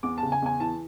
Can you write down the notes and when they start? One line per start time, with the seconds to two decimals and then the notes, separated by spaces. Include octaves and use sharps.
0.03 E2 D6
0.18 A5
0.23 C#3
0.32 G#5
0.42 E2 G#5
0.60 E3 A5